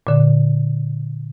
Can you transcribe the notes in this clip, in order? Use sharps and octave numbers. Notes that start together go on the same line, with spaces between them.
A#2 D3